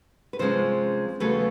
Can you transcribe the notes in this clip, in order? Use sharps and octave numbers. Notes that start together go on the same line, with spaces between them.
B4
C3 F3 G#3 C#4 C5
E2 C#3 F#3 A3 B4